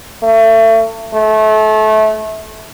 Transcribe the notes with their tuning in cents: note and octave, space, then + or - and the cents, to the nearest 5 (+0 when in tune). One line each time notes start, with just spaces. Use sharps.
A3 +30
A3 -25